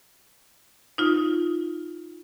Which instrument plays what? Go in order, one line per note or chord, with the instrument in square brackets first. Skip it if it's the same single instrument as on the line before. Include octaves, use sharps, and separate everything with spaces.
[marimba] D#4 F4